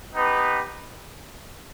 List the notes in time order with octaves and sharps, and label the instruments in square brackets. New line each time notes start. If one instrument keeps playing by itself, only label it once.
[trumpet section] B3 D#4 G4 B4